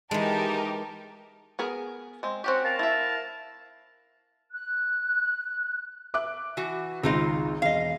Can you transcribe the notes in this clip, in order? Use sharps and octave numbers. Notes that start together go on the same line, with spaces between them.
E3 G#3 D#4 G4 A#4 A5
B3 G#4 A#4
G#3 C4
C4 C#4 F#4 G4
A#4 F5 A5
E4 E5
F#6
E5 D6 F#6
E3 F#4
G#1 C#2 C4 D#4 F4
E1 D#5 F5